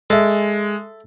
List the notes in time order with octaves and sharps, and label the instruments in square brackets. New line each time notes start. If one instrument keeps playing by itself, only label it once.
[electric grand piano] G#3 [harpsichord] A4 E5